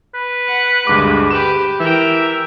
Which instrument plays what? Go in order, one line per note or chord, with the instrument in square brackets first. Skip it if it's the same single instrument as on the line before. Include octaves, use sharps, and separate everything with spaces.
[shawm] B4
[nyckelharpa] F#5
[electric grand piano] D2 G2 D6 [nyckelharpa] G#3
[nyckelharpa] G4 B4 [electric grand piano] E7
[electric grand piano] E3 [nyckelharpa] A#4 G5 [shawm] E5